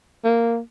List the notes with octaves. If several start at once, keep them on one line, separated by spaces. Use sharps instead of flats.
A#3